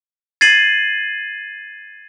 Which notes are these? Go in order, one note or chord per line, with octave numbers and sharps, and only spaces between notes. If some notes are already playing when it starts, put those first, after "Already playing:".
G#6 A6 C7 D#7 F#7